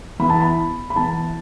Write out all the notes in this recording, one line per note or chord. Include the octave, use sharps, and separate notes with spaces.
E3 B3 E4 B5
A5
B5
B5
E3 B3 E4 A5